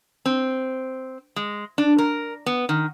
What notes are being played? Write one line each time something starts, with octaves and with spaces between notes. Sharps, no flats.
C4
G#3
D4
A#4
B3
D#3